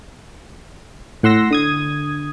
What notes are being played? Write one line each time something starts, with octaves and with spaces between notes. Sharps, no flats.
A2 F#5 C6 E6 A#6
D3 D#6 G#6